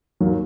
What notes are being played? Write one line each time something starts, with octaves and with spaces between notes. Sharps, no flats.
D#2 D#3 F#3